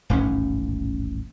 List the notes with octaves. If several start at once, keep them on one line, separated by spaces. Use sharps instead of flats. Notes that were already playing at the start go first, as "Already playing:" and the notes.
D#1 A1 G#2 C#4